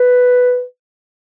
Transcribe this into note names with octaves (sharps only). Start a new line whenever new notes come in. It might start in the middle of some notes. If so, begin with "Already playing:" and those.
Already playing: B4